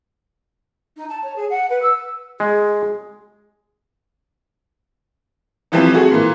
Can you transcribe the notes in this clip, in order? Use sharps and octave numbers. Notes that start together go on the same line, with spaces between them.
D#4
A5
C#5
G#4
F#5
B4
E6
G#3 G#4
C3 E3 F3 G3 C4
A3 F#4 G#4
A#2 E3